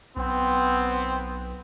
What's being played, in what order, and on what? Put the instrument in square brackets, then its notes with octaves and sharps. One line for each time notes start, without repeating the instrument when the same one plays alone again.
[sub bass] B1 [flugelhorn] B3 [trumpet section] C4